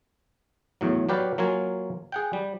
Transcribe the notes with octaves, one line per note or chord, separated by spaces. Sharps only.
E2 A2 F#3
F#3 G4 B4 D5 F5
F#3 A#3 F4 F5 G#5
G#4 F#5 G5
G3